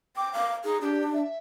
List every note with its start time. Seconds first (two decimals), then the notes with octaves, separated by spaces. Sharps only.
0.16 G5 D6
0.33 F5
0.64 D#4 G#4
0.82 D4 G4
1.12 E5